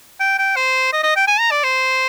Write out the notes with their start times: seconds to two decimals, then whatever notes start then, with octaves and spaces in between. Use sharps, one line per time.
0.20 G5
0.38 G5
0.56 C5
0.92 D#5
1.03 D#5
1.16 G5
1.27 G#5
1.39 A#5
1.51 D5
1.63 C5